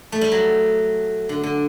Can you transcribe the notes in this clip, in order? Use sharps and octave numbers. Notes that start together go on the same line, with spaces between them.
A3
G3
F#3
D3
D3